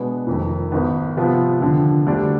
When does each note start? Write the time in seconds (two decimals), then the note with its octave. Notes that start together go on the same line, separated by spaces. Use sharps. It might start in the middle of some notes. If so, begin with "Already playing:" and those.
Already playing: B2 G#3 B3 D4
0.27 F1 F2 D#3
0.72 G#1 G#2 D#3 B3
1.17 C3 F3 B3 F4
1.61 D#2 D3 F3
2.07 D2 D3 G3 D4